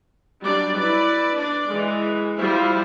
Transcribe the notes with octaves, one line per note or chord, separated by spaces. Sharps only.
F#3 G3 D4 D5
E4 B4 D5
D4 D5
E3 G#3
F3 G3 E4 F4 C5